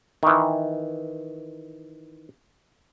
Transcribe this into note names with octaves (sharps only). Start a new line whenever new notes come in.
D#3 E3